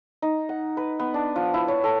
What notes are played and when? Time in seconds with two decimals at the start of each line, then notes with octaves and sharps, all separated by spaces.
0.22 D#4
0.49 F#5
0.77 B4
0.99 B3
1.14 D4
1.36 F3
1.54 E4
1.68 C#5
1.84 A4